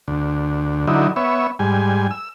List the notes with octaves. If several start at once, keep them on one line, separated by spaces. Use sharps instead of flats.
D2
D3 F#3 D#4 E4
B3 C#5 E5
G#2 G3 G#5
E6